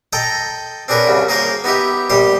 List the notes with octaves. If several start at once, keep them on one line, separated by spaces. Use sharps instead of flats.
A4 D#5 G5 A5 A#5
C4 D4 G#4 A#4 B4 C#5
C2 C#3 F#3
A#3 G#4 A#4 C5 C#5 F5
B3 D#4 G4 E5
A#1 G3 G4 C5 C6